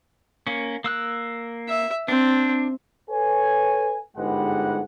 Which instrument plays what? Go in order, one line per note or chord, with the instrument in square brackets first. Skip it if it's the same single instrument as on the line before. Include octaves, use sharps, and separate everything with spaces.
[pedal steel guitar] A#3 C#4
A#3 E6 F#6
[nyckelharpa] E5
[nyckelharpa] C4 [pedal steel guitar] D4
[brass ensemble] A4 B4 C#5 G#5
G1 G#2 G3 G#3 B4 F#5